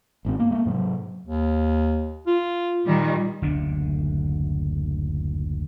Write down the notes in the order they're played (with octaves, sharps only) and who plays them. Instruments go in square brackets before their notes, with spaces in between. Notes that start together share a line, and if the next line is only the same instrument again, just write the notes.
[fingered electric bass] G#1 G#2 C4
A#3
G#3 A#3
G#2 C3 F#3
[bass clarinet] D#2
F4
[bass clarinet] A#2 [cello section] D#3 G3
[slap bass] F#1 D2 D3 D4